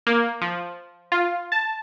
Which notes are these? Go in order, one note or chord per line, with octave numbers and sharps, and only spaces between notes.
A#3
F3
F4
A5